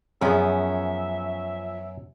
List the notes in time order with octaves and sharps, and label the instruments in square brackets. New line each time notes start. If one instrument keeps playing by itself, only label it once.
[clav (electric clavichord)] F#2 B3 [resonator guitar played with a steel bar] F3 C#4 [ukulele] F4 G#4 [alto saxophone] E5